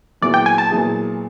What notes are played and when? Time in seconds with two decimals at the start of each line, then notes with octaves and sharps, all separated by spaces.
0.22 A#2 F#3 B3 E4 G#4 D5
0.34 G5
0.46 G#5
0.58 A5
0.70 A#2 F#3 B3 E4 G#4